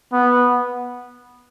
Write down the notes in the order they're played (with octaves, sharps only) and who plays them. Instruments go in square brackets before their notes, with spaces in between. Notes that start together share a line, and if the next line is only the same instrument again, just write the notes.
[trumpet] B3